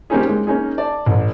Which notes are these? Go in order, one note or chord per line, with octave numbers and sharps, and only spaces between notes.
G3 A#3 C4 C#4 D#4 G#4
G#3
A#3 C#4 D#4 G#4
D5 A5
A1